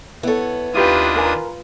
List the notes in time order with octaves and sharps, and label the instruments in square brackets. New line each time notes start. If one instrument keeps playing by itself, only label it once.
[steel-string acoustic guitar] B3 C#5 [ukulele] E4 A4
[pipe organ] D#2 D4 D#6 [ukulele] E4 G4 [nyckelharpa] F4 B4
[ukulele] A#4 G#5 A#5